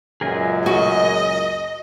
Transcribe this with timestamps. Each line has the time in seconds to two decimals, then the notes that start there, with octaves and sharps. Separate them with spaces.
0.21 C#2 F#2 A#2 G#4 A#4 G#5
0.66 F#4 D#5